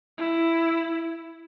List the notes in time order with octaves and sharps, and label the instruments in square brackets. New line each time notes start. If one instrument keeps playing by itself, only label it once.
[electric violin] E4